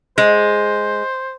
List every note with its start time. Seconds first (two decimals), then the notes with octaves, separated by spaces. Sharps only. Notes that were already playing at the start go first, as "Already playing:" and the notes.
0.18 G#3 C5